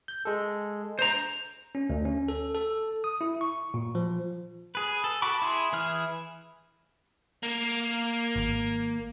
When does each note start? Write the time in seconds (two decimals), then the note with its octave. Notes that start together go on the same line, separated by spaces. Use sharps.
0.08 G6
0.25 G#3 A4
0.99 C5 A#5
1.75 C#4
1.90 D2
2.05 C#4
2.28 A4
2.55 A4
3.04 D#6
3.21 E4
3.41 C#6
3.74 A#2
3.95 F3
4.75 G#4 B4
5.04 A4
5.22 F#4 A5 B5 C#6 D6
5.42 E4 G#4 C6
5.73 E3 E4 G#4 F6
7.43 A#3
8.36 G#1